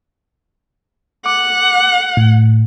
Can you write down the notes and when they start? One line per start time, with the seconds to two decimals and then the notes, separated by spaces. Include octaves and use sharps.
1.26 F#5 D6
2.17 A2